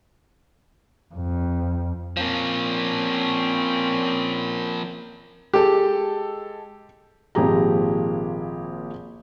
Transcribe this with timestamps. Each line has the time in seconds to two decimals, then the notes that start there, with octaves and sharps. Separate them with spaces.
1.14 F2
2.17 F3 A#3 C4 C#4
5.53 G#3 G4 A4
7.35 G#1 A#2 F3 G4 G#4 A#5